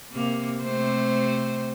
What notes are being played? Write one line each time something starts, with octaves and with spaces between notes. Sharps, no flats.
C3 A#3
C3 A3 C5